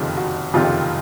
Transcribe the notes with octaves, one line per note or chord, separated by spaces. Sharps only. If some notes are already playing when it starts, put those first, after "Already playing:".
Already playing: F#1 F2 C3 D#3 F4
F#4
F#1 F2 C3 D#3 F4